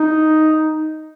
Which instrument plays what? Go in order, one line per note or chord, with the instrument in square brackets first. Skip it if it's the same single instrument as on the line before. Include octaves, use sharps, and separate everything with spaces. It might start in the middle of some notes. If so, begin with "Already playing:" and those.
Already playing: [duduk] D#4